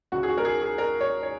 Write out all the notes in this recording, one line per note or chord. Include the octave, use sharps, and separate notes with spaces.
C#2 C#3 F#4
G#4
F#4
A#4
G#4
G#4
A#4
C#5
C#5